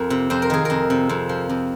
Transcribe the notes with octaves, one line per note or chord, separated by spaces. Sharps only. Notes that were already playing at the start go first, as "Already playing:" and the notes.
Already playing: F2 A#4
C3
F2 C5
A#4
D#3 G#4
F2 A#4
C3
F2
F3
F2